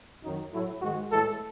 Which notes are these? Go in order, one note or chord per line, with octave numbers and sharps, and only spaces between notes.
F#2 D#3 F#3 D#4
A2 F#3 A3 E4
G#2 D#3 G#3 F#4
A2 E3 G#3 A4